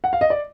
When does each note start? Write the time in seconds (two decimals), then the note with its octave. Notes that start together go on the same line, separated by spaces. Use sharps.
0.04 F#5
0.13 F5
0.21 D#5
0.30 D5